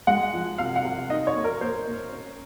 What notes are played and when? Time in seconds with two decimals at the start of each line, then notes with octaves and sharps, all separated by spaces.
0.07 G#3 F#5
0.34 F3
0.58 C3 F5
0.76 F#5
0.84 C3
1.10 D#4 D#5
1.27 C#5
1.35 A#3
1.44 A#4
1.61 A#3 C5
1.87 A#3
2.12 C#4